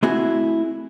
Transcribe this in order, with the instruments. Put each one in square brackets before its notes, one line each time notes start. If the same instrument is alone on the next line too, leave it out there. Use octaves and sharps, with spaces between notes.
[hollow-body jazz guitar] A3 C4 E4 F#4 G#4